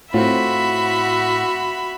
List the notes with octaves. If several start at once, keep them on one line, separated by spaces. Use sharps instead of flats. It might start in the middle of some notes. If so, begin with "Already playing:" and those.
A2 C4 F4 F#4 E5 B5